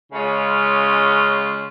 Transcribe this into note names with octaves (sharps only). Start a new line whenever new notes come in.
C#3 G#3 C#4 F4